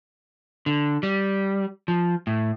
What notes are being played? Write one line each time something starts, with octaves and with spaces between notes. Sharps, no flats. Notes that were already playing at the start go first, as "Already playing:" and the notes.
D3
G3
F3
A2